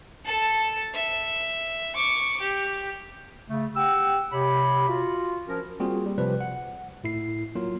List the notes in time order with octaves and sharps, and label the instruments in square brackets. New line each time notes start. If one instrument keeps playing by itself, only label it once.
[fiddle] A4 A5
E5
C#6 D6
G4
[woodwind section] C#3 A3
G4 F#5 G5 E6
C3 G4 C#5 B5
F4 F#4
F3 C#4 A#4
[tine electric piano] G3 A#3 C4 F4 F#4 G#4
G3
C3 F3 G3 B4
F#5
A2 E4 C7
F#3 A#3 F4